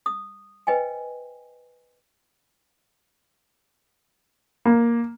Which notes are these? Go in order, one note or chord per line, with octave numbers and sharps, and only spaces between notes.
D#6
B4 C5 D#5 G5 G#5
A#3